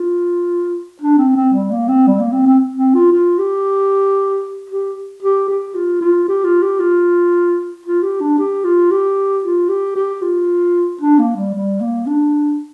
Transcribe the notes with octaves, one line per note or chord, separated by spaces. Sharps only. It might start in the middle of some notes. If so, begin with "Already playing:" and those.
Already playing: F4
D4
C4
C4
G3
A#3
C4
G3
A#3
C4
C4
C4
F4
F4
G4
G4
G4
G4
F4
F4
G4
F4
G4
F4
F4
G4
D4
G4
F4
G4
F4
G4
G4
F4
D4
A#3
G3
G3
A#3
D4